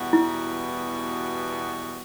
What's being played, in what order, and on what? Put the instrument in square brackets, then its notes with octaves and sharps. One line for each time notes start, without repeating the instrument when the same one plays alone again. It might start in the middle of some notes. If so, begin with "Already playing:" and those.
Already playing: [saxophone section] E2 B2 G3 B3 F#4
[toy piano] E4